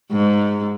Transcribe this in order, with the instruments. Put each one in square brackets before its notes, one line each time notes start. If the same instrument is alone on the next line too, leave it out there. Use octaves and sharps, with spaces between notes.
[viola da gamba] G#2